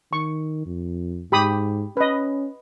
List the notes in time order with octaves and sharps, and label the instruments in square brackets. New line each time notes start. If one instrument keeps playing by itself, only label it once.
[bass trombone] D#3 [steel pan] C#6
[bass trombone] F2
[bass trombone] G#2 [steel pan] G4 B5 D#6
[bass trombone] C#4 [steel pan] B4 D#5